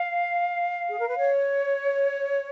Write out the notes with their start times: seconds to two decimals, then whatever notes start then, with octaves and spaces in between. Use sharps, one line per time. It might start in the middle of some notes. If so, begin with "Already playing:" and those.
Already playing: F5
0.89 G#4
0.98 A#4
1.07 B4
1.16 C#5